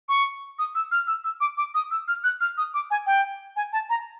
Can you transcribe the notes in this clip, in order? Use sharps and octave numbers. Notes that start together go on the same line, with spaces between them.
C#6
D#6
E6
F6
E6
E6
D6
D6
D#6
E6
F6
F#6
F6
D#6
D6
G#5
G5
G#5
A5
A#5